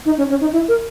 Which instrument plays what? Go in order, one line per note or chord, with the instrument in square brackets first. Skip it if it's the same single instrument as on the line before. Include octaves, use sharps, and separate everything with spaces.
[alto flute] D#4
C#4
C#4
D#4
E4
A#4